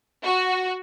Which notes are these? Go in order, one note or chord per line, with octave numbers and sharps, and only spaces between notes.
F#4